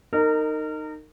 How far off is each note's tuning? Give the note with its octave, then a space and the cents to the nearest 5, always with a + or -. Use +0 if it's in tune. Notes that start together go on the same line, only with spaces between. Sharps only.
D#4 -10 A#4 -30